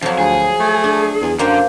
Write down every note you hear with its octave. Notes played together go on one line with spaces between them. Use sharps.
F2 F3 F#3
D2 G#4
A3
D4
E2
F#2 D3 A#3 C5 G5